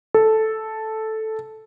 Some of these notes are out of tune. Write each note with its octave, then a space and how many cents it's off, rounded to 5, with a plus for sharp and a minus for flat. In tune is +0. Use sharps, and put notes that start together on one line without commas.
A4 -5